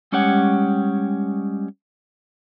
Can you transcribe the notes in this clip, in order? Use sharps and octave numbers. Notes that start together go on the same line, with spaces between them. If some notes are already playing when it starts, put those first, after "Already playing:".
G3 G#3 C#4 G4 C#5 F#5